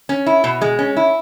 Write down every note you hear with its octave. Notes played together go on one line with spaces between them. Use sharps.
C#4
E4
B2
G#3
C#4
E4